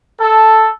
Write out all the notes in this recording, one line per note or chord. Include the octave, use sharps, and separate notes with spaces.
A4